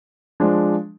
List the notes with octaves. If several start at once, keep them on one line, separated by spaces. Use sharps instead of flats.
F3 G#3 D4